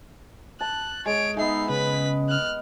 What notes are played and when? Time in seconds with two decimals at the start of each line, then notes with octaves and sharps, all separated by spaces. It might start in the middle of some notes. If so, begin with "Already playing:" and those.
0.60 A5 F#6
1.06 G#3 C#5 D7
1.37 G#3 B3 D#4 E5 C7
1.70 C#3 B4 B6
2.29 F6 F#6